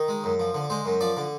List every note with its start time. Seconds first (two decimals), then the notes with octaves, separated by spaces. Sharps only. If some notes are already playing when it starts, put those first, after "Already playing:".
Already playing: D#3
0.08 G#3
0.24 F#2
0.40 F3
0.54 D3
0.70 G#3 C5
0.86 F#2
1.01 F3 D5
1.17 D3